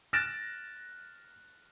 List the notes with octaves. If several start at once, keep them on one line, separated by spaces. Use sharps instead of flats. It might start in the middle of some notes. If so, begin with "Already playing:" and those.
F6 F#6 A6 A#6 D7 E7